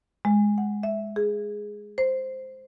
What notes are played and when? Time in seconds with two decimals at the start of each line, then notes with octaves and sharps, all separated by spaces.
0.25 G#3
0.58 F#5
0.83 E5
1.16 G#4
1.98 C5